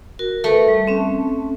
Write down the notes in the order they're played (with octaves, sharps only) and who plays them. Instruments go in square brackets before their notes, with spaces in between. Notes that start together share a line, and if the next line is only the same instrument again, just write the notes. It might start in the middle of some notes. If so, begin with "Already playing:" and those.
[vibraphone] F#4 A#4
[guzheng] A3 [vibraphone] A#4 B4
[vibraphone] G3
C4 C#4